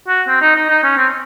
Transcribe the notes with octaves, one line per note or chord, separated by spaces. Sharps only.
F#4
C4
D#4
D#4
D#4
C#4
C4